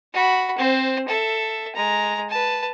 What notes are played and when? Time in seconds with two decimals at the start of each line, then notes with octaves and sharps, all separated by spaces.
0.14 F#4 B5
0.58 C4 C5
1.08 A4 E5
1.75 G#3 A#5
2.29 B4 A5